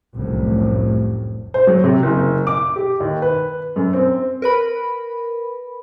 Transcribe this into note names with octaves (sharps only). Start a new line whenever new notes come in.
F1 C2 F#2 A2
C5
F#3
C3
F#1
D6
G4
D#2
B4
F#2
C4
A#4 B4 B5